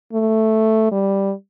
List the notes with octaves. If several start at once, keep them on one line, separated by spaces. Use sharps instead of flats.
A3
G3